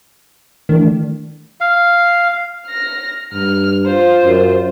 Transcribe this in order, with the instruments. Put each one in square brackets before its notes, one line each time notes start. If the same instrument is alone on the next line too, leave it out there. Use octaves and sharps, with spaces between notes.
[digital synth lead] D#3 [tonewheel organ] E3 A3 D4
[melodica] F5
[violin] F6 A#6
[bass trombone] G2 [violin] F6
[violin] F4 C5
[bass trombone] F#2